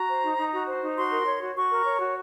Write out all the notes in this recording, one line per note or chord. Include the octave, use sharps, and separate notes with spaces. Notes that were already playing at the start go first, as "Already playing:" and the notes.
Already playing: F#4 A#5
C5
D#4
D#4
F#4
C5
D#4
F#4 C6
A#4
C#5
F#4
F#4 C#6
A#4
C#5
F#4